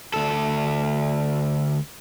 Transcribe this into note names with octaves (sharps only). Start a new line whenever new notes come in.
D2 A4